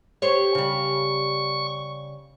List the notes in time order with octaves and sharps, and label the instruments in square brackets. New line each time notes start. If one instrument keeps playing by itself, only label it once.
[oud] G4 C5 C#5 [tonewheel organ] C#6
[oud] C#3 G3